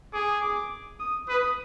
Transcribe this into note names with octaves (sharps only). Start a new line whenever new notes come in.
G#4 D6
D6
D#6
B4 D#6